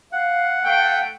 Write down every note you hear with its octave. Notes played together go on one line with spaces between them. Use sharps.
F5 F#5
A3 G5